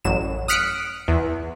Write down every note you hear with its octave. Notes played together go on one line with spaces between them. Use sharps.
A1 F#2 E7
D#6 F6 F#6 B6 C#7 D7
E2